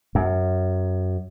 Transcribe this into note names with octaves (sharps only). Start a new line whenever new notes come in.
F#2